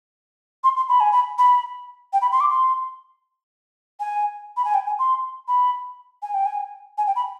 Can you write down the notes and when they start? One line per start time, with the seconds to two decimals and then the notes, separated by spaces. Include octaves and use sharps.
0.63 C6
0.76 C6
0.88 B5
1.00 G#5
1.12 B5
1.38 B5
2.13 G5
2.21 B5
2.32 C6
2.40 D6
2.50 C6
4.00 G#5
4.56 B5
4.64 G#5
4.74 G5
4.86 G#5
4.99 C6
5.48 B5
6.22 G#5
6.34 G5
6.45 G#5
6.97 G#5
7.06 G5
7.15 B5